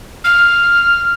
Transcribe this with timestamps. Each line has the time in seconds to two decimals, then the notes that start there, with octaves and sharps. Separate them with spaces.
0.24 F6